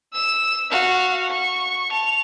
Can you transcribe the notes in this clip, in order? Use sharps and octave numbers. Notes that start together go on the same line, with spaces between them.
E6 E7
F#4 F5
C#6
A5 F7